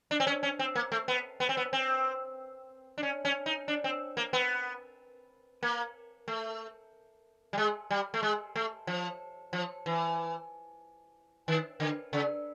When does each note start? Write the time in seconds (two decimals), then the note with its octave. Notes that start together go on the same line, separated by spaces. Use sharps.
0.11 D4
0.20 C4
0.27 C#4
0.43 C#4
0.59 C4
0.75 A#3
0.92 A3
1.08 B3
1.40 B3
1.49 C4
1.57 B3
1.73 C4
2.98 D4
3.03 C#4
3.25 C#4
3.46 D#4
3.68 D4
3.84 C4
4.17 A#3
4.33 B3
5.63 A#3
6.28 A3
7.53 G3
7.58 G#3
7.91 G3
8.14 A3
8.23 G#3
8.56 A3
8.87 F3
9.53 F3
9.86 E3
11.48 D#3
11.80 D3
12.13 C#3